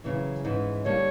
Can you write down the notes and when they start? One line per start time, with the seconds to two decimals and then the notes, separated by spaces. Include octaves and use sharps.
0.04 F#2 C#3 E3
0.45 G#2 E3 G#3 C#4
0.85 D3 G3 A#3 C#5